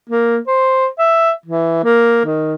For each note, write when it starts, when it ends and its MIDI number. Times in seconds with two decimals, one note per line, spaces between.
0.09 0.38 58
0.47 0.86 72
0.98 1.31 76
1.46 1.80 52
1.84 2.25 58
2.25 2.55 51